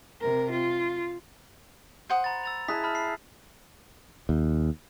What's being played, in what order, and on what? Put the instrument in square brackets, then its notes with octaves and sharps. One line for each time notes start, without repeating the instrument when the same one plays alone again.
[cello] C3 A#4
F4
[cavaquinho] C5 F#5 D#6
[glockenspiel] A#5 B5 A6
E6 A6 F7
[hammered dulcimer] E4 G#4 [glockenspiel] A5 F#6 B6
[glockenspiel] A5 B5 F6
C7
[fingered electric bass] D#2